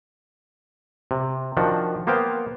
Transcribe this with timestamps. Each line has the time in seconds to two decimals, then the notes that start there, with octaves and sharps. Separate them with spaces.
1.11 C3
1.57 D#3 F3 D4 F#4
2.07 A#3 B3 C5 F5 G5